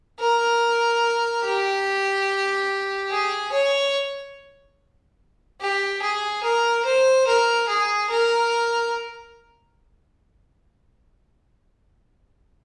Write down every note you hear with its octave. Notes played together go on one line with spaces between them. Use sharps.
A#4
G4
G#4
C#5
G4
G#4
A#4
C5
A#4
G#4
A#4